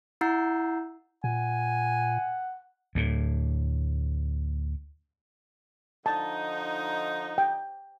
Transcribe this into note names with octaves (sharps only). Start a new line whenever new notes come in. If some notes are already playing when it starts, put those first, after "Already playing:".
E4 F#5 A#5 E6 G6 C7
A#2 F#5 G#5
D2 A2
D3 F3 D#4 A5
G5